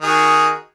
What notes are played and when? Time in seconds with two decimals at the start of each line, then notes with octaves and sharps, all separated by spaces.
0.01 D#3
0.04 G#4
0.07 F#4